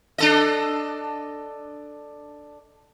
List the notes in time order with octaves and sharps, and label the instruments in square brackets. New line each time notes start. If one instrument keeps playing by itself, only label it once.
[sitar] D4 A4 D#5